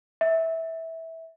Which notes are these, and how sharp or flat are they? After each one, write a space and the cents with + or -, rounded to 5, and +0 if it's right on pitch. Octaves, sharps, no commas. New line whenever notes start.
E5 -15